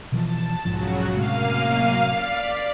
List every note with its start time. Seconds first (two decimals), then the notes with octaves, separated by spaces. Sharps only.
0.12 B2 E3 F3 A5
0.65 B1 G#2 C#3 F3 F#3 F#4
1.17 F#2 A2 C3 G#3 A#3 F5 D#7
2.06 D5 B6